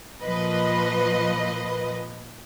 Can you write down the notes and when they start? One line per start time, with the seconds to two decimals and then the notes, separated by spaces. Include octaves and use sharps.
0.23 A#2 F3 B4 D#5